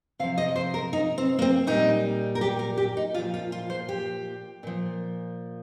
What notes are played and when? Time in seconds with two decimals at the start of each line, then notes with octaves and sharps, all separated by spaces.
0.19 C3 F5
0.23 F3
0.38 D#5
0.56 C5
0.74 A#4
0.93 D#4
1.18 C4
1.39 A#3
1.42 C4
1.67 A#2 G3 D#4
2.35 A#4
2.41 G4
2.59 A#4
2.77 G4
2.97 D#4
3.14 A#2 F3 F4
3.34 F4
3.52 F4
3.70 C5
3.89 G4
4.63 A#2 F3